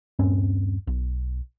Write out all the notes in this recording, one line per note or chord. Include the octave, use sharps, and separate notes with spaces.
D#1 G2 C4 C#4
B1